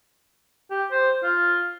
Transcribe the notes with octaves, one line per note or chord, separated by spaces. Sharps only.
G4
C5
F4